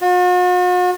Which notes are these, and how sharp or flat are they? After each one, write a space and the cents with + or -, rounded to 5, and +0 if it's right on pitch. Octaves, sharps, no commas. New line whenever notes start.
F#4 -45